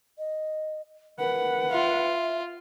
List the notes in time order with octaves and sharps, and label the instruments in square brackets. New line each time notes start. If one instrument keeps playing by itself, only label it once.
[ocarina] D#5
[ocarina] A#4 [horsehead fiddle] B4 F#5
[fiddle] F4 [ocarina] E5